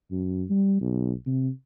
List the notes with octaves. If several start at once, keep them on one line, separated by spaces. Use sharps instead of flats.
F#2
G3
B1
C3